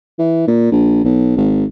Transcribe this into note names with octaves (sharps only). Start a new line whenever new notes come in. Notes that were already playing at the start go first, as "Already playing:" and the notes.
E3
A#2
A#1
B1
G#1